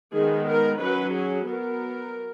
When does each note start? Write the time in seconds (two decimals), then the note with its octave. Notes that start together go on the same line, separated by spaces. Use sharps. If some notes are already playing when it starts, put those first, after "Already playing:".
0.14 D#3 G#3 B3 G#4
0.48 A#4
0.81 F#3 C#4 B4
1.14 G#4
1.48 F#3 B3 A#4